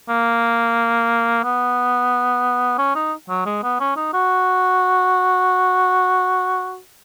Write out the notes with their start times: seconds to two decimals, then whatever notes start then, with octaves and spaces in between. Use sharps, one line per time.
0.09 A#3
1.44 B3
2.78 C#4
2.95 D#4
3.29 F#3
3.46 G#3
3.63 B3
3.80 C#4
3.97 D#4
4.13 F#4